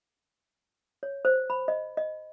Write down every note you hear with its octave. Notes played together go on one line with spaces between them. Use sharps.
C#5
C5
B5
D#5
D#5